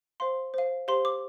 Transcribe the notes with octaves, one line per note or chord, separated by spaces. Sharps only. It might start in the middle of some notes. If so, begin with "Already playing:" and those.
C5 F5 C6
C5 F5
G4 C5 F5 C6
D6